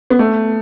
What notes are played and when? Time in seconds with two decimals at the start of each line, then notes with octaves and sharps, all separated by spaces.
0.10 B3
0.19 A3